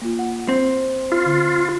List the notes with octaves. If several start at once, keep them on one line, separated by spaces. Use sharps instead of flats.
A#3 F4
F#5
C4
F4
D3